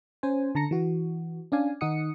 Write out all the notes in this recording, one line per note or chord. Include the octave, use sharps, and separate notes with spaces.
C#4 C5 G#5
D3 A5 A#5 A#6 C#7
E3 F#4
C#4 D4 D5 F5 G#5
D#3 D#4 F#5 D#6 C#7